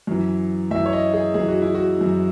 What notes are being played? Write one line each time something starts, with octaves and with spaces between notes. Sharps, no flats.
F#2 E3
F#2 E3 E5
C#5
D#5
G#4
F#2 E3 G#4
F#4
E4
F#4
F#2 E3